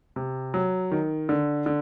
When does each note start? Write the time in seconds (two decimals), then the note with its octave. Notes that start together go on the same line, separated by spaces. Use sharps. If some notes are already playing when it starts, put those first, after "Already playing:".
0.16 C3
0.54 F#3
0.91 D#3
1.29 D3
1.66 D3